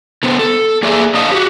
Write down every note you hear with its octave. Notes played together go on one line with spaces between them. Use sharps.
D3 B3 C5
A4
A#3 G#4 D5 E5
D4 D#5 F5
F#4 G4